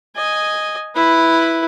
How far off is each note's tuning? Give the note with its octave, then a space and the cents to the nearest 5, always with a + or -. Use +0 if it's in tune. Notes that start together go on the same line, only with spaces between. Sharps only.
D#5 +0 G#5 +0
E4 +0 B4 +0